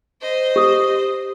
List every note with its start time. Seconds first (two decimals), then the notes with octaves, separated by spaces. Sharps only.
0.22 C5 D#5
0.56 G4 D#6